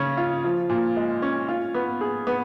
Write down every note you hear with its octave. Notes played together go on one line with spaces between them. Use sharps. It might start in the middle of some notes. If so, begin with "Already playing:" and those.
Already playing: C#3 C#4
F4
F3
A#2
G#3
C#4
F4
B3
G#4
B3